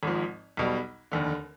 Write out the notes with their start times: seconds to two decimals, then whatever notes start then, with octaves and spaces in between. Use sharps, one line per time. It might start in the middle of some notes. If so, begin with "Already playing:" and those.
0.03 G#1 G#2 F3
0.57 B1 B2 G3
1.12 F1 D#2 D3